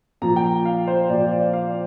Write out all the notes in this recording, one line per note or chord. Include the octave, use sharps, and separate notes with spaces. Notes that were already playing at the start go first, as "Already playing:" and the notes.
A#2 F3 A#5
G5
A#5
F5
C5
A#2 F3 D5
D5
F5